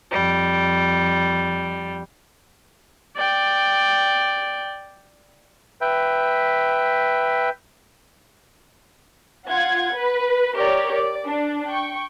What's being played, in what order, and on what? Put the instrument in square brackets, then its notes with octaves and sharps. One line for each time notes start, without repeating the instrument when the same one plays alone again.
[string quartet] F2 G3
[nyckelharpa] D5 G5
[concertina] B4 E5 G5
[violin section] F4 F#5 G#6
B4
G4 A#4 C#5 D5
D5
D4
G5 C#6